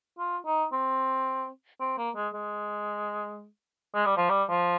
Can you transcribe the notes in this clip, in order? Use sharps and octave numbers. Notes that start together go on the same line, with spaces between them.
F4
D#4
C4
C4
A#3
G#3
G#3
G#3
G3
F3
G3
F3